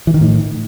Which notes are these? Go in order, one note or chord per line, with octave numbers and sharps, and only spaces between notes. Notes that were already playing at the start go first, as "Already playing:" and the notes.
E3
D#3
A2